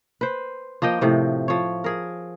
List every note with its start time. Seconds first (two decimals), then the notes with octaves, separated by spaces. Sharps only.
0.21 B4 C5
0.82 F3 A#3 D#5 G5
1.01 A2 C3 F3
1.48 F3 C#5
1.84 G#4 A#4